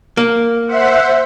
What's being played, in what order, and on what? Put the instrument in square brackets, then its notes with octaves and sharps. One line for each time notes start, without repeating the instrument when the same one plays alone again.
[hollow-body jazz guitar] A#3
[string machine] C5 E5 F#5